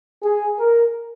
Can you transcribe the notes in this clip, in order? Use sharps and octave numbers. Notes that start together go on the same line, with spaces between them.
G#4
A#4